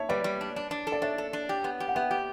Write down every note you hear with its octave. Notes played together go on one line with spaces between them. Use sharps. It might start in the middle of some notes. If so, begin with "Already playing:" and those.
Already playing: C#5 E5 A5
G3 B4 D5
G3
D4
D4
D4
A4
D5
D4 C#5 E5
A4
D4
G4
B3
G4
F#5
B3 E5 G5
G4